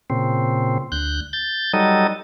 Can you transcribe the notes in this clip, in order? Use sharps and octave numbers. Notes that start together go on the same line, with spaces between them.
A#2 C#3 C4
D2 F#6 G6
G6 A6
F#3 G3 D#4 A4 D#5